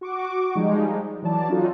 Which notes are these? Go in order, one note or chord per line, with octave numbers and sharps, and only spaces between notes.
F#4 C#6 D6
F3 G3 G#3 D#4
E3 F#3 D5 A5
C#4 D#4 F4 F#4 A4